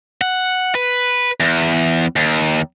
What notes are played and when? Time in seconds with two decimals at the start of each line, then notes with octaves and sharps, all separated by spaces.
0.21 F#5
0.75 B4
1.40 E2
2.16 D#2